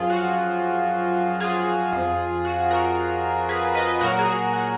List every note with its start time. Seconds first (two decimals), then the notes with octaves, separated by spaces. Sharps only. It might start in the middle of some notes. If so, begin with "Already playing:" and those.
Already playing: F#2 F3 F4 G#4
0.10 F#4
1.40 F4 G#4
1.92 F2 F3
2.45 F#4
2.70 F#4 A#4
3.49 G#4 B4
3.75 B4 D#5
4.01 A#2 F#3 F#4 A#4
4.19 G#4
4.27 F#4
4.53 F#4